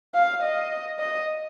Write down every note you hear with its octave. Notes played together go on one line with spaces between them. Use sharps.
F5
D#5
D#5